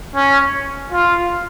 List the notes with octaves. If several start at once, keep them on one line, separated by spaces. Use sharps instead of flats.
C#4
F4